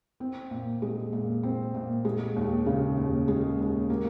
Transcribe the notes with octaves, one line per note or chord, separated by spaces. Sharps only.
C4
A#2
G#3
A#2
C4
A#2
G#3
D#2
C#3
D#2
G#3
D#2
A#3